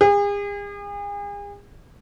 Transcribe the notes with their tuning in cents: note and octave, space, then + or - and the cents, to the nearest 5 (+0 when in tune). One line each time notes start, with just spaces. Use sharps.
G#4 -40